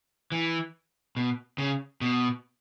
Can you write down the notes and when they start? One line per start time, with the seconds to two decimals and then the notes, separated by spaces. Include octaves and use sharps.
0.32 E3
1.17 B2
1.58 C#3
2.01 B2